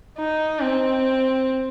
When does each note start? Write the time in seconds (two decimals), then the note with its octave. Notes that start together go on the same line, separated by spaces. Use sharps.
0.19 D#4
0.61 C4